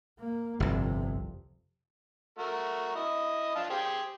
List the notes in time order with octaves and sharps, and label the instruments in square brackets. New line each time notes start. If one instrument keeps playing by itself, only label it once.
[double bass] A#3
[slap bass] G1 C2 [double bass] F2 C3
[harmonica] A3 F#4 A#4
E4 D#5
D4 F4 A5
G4 G#4 C5